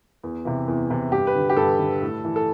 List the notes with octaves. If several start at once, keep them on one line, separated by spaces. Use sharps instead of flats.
E2
C3 E3
E2
C3 E3
G2 G4
B4
D3
G4
G2 A4
D3
A2
E3
A4